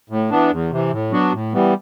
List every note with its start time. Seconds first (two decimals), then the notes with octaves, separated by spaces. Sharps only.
0.10 A2
0.30 E3 B3 D4
0.50 E2
0.71 C3 E3
0.92 A2
1.12 F#3 B3 D4 F#4
1.33 A2
1.53 E3 G3 B3